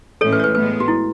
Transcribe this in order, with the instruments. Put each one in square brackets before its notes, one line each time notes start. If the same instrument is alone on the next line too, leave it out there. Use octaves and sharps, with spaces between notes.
[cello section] A2 E3 G#3 C#4 [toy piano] A4 C#5
[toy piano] B4
C#5
B4
[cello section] A2 G#3 B3 [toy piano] B4
[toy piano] F#4
E4